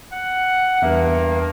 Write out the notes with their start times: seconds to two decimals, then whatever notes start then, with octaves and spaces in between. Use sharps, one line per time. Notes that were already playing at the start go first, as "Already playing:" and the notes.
0.12 F#5
0.82 E2 G2 A#3 E5